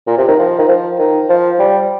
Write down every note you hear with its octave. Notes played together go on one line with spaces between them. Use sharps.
A#2
C3
D#3
F3
D#3
F3
D#3
F3
G3